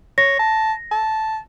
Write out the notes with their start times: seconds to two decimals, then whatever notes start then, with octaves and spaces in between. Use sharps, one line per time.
0.18 C#5 A#6
0.39 A5
0.91 A5